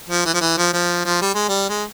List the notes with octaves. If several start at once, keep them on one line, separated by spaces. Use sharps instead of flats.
F3
E3
F3
E3
F3
F3
F3
G3
G#3
G3
G#3